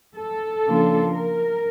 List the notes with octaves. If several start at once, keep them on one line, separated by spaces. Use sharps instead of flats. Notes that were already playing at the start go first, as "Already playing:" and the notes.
A4
C#3 F3 A#3 D4 F4
A#4